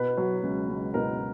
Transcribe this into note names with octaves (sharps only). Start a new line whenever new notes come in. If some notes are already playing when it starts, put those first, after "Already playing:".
Already playing: B2 B4
F#3
C#2
C#2
B2 A#4